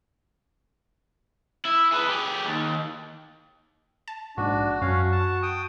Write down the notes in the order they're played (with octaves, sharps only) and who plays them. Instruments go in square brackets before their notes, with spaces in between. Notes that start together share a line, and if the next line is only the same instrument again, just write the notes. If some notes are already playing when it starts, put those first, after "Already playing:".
[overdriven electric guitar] E4
G#4 B4
G4 G#4
D#2
[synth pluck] A5
[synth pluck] A#1 G#2 [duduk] D4 [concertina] F#4
[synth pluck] F#2 [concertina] C#4 F5 [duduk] F#4
[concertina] A5
G5 D#6